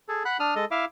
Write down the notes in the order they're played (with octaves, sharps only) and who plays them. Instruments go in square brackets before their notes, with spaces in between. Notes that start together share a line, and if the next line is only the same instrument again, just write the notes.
[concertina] G#4 A4
F#5 B5 F#6
D4 D#6 F6
G#3 A4 D#5
E4 E5 F5 D6